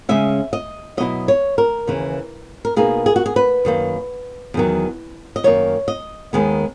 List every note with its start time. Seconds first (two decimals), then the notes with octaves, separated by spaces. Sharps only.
0.09 C#3 G#3 C#4 E5
0.53 D#5
0.97 B2 F#3 B3 E4 D#5
1.28 C#5
1.58 A#4
1.87 D#2 C#3 E3
2.65 A#4
2.76 B2 A#3 D#4 G#4
3.06 G#4
3.16 F#4
3.26 G#4
3.36 B4
3.65 F#2 D#3 A#3
4.54 E2 D#3 F#3
5.36 D#5
5.44 F#2 D#3 A#3 C#5
5.88 D#5
6.33 D#2 D#3 G#3 B3 G#5